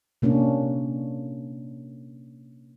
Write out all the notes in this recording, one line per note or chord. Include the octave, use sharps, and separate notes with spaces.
C3 A#3 C#4 D4